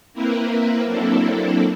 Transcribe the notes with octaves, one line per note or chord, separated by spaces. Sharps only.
A#3 C4 E4 A#4 B4
F#3 A#3 C4 D4 E4 A4